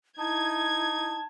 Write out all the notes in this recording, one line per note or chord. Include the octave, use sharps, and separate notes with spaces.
D#4 E4 A5 G#6